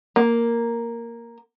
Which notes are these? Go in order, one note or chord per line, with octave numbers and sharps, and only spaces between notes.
A#3